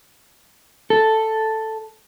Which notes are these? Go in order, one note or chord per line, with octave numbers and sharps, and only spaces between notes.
A4